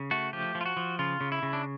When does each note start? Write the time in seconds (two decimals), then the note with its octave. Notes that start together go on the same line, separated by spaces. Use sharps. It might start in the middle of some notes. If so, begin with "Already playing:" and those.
Already playing: C#3
0.11 A3 F#4
0.33 F3 G4
0.55 F3
0.61 F4
0.66 F#4
0.77 F3
0.99 C#3 F4
1.21 C#3
1.32 E4
1.43 C#3
1.53 D4